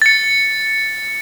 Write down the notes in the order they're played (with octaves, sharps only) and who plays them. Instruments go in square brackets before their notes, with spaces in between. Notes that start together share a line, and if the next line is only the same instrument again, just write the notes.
[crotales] A6 C#7